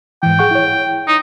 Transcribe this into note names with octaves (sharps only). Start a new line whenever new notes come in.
G#2 E3 G5
G#4 F#5 C#6
E4 C#5
D#4